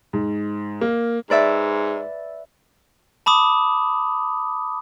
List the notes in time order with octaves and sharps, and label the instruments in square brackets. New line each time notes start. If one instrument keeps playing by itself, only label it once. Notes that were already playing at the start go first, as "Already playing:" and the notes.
[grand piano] G#2
A#3
[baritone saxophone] G#2 [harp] B4 D5 E5
[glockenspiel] A5 B5 D6 D#6